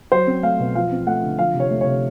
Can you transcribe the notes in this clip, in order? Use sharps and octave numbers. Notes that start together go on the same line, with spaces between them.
F#3 C5
C4
A3 F5
B2
F3 F5
C4
A3 F#5
D3
F3 F5
C3
C#5
A3
C#5
C3